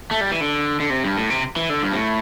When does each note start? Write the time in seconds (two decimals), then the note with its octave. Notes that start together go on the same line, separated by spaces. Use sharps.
0.11 A3
0.21 G3
0.32 E3
0.41 D3
0.80 D3
0.90 C3
1.04 G2
1.17 A2
1.30 C3
1.56 E3
1.70 D3
1.83 G2
1.92 C3
1.96 A2